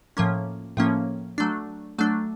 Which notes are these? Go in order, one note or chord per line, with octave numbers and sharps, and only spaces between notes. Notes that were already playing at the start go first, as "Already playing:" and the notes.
A2 F3 A#3 C#4
A2 F3 A#3 C#4
F#3 A3 D4
F#3 A3 D4